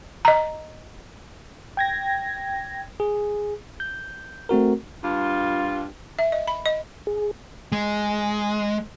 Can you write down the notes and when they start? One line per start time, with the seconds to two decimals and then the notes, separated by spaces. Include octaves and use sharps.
0.25 D#5 A#5
1.77 G5 G#6 A#6
3.00 G#4
3.80 G6
4.49 A3 C4 F#4 A#4
5.04 G2 F4
6.19 E5
6.32 D#5
6.48 B5
6.66 D#5
7.07 G#4
7.72 G#3